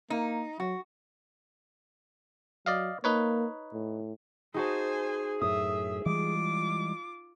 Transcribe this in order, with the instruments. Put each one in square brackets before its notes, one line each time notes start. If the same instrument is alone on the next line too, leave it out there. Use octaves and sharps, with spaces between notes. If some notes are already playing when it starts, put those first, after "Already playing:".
[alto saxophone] A#3 [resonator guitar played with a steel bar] D#4
[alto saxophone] F#3 [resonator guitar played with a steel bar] F#4
[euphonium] F#3 [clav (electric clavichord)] D5 D#5 F5
[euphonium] A#3 [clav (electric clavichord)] D#4 B4 C#5
[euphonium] A2
[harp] D#4 F#4 A5 [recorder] G#4 [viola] C5 G#5
[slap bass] F#2 A2 [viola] E5 [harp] D#6
[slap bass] E3 G3 G#3 [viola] F4 D6